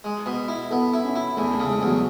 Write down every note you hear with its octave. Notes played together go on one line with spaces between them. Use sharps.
G#3
B2
E4
B3 A4
E4
C#4
E4
E2 A3
A3
C#3
G#3
E2
F#3